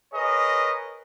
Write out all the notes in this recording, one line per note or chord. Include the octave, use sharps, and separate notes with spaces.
G#4 A#4 B4 C#5 D#5